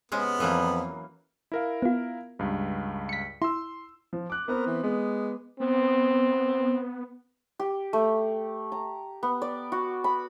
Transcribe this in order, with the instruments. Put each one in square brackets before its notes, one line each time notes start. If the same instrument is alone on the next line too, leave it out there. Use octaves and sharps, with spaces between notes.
[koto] C3 G#3 C#4 [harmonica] B3
[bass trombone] F2 [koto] E3 F#3 A#3
[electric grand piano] E4 A#4 F5
[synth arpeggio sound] B3 F4
[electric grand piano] C#2 G2
[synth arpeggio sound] B6 C#7
[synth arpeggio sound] E4 [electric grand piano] C6 E6
[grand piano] F3
D6 F#6
[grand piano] B3 C4 B4 [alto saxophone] A#4
[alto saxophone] E3
[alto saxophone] G#3 [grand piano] B3
[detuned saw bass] B3 [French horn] C4
[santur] G4
A3
A#5
B3
D5
F#4
B5